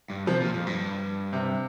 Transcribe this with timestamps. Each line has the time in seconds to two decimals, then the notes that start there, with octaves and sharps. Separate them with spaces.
0.10 G2
0.27 C3 F3
0.41 A#2
0.54 F2
0.67 G2
1.33 C3